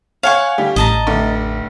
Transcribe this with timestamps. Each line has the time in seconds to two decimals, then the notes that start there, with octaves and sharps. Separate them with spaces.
0.23 C#5 F5 F#5 G#5 C#6
0.58 D3 G3 G4
0.76 A1 D#5 A5 A#5
1.07 F1 D3 A3